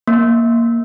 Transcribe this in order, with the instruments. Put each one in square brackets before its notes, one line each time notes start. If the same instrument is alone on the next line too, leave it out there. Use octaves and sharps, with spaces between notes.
[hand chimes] A#3